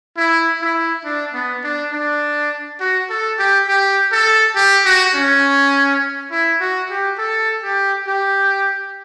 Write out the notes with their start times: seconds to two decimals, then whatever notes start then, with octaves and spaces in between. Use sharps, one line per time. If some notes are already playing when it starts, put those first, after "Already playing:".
0.17 E4
0.61 E4
1.04 D4
1.33 B3
1.64 D4
1.92 D4
2.80 F#4
3.10 A4
3.39 G4
3.67 G4
4.12 A4
4.55 G4
4.85 F#4
5.14 C#4
6.31 E4
6.60 F#4
6.90 G4
7.18 A4
7.63 G4
8.07 G4